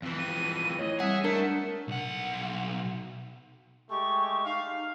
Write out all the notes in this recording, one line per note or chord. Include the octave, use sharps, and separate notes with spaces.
F2 E3
G5 D#7
A3 E4 C#5 D#5
G3 C4 G#4 E5 F#5
A3 D4 A#4 C#7
B1 F#5
G#3 A3 G4 C#6
D#4 F5